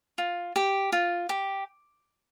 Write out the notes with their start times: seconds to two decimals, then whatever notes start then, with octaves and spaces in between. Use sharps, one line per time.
0.18 F4
0.56 G4
0.92 F4
1.29 G4